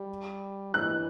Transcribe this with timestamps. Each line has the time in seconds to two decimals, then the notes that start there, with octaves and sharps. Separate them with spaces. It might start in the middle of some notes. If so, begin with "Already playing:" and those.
Already playing: G3
0.74 E3 F#6